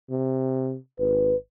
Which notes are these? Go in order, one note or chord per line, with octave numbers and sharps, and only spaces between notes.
C3
G#1 B4